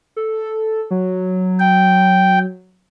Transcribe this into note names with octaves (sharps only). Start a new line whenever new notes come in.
A4
F#3
G5